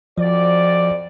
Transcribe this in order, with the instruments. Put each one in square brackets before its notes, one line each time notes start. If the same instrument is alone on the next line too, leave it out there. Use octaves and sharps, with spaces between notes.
[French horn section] F2 F#4 D5 [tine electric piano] F3